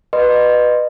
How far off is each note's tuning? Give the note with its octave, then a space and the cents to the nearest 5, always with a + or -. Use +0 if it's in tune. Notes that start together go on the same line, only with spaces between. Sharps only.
B4 +0 D#5 -30 C6 +0